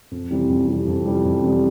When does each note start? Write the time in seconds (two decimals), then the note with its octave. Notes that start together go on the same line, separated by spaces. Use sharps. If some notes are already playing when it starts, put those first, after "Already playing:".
0.11 F2
0.31 C3 E3 G3
0.49 F2
0.68 C3 E3 G3
0.88 F2
1.05 C3 E3 G3
1.25 F2
1.43 C3 E3 G3